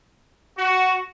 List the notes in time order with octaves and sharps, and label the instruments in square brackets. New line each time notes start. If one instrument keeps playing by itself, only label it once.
[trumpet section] F#4